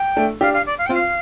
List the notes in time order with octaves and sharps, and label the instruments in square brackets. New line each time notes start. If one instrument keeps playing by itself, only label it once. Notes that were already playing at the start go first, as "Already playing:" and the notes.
Already playing: [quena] G5
[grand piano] A3 D4
[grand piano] D4 G4 [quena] F5
[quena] F5
D5
F5
[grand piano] C4 F4 [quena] G5
[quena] F5